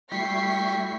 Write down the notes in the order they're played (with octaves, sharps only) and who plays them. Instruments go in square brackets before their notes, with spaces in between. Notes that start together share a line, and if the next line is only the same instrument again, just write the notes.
[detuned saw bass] G3 [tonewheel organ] A3 E4 F#4 [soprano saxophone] G5 [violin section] C#6 B6 C7